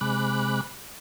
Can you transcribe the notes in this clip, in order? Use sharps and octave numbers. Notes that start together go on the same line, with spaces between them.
C3 G#3 B5 D6 F#6